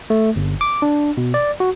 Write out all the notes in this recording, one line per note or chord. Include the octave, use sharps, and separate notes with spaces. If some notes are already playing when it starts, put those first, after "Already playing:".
A3
G1
D6
D4
B2
D5
F#4